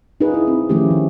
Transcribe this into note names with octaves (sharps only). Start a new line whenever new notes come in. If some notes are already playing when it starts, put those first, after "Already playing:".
D#4 F4 G#4 B4
E4
C4
D#3 F3 A3 C#4 G4
D#3